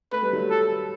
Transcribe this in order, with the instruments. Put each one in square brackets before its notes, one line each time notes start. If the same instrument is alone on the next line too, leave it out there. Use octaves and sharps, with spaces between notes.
[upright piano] A3 [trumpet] B4
[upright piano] G3
F#3 A3
[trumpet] A4